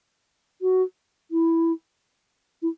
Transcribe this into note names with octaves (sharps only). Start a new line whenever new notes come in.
F#4
E4
E4